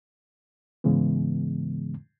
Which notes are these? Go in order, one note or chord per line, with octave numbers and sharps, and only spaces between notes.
G#2 C#3 E3 G#3 B3